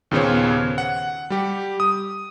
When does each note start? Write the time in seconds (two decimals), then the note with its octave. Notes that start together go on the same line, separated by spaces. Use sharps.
0.11 D#2 A#2 C#3 B3 C5 C#5
0.78 F#5
1.30 G3 G4
1.80 D#6